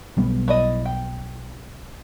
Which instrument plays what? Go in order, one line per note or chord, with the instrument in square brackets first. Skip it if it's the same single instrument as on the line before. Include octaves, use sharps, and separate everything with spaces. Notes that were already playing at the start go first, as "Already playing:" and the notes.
[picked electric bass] B1 G3 B3
[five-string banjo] E4 D5 D#5
G5